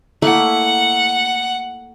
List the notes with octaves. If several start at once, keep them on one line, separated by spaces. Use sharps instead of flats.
A3 A#3 E4 F#5